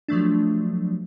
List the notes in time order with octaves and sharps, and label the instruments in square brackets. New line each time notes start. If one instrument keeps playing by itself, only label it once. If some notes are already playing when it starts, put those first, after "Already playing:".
[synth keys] F3 F#3 A3 D4